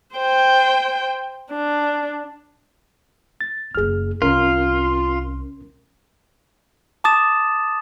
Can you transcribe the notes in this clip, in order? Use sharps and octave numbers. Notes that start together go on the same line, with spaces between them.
C5 G5
D4
A6
F#1 E4 G#4 F6
C2 C#4 F4 A#4
A5 D6 D#6 A6 E7